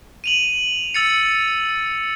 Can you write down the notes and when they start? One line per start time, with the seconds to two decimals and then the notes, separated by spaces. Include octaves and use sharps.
0.24 D#7 F7 F#7
0.94 E6 A6 C#7